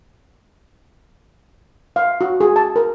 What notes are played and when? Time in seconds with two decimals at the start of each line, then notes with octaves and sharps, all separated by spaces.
1.96 F5
2.21 F#4
2.40 G#4
2.56 A5
2.76 A#4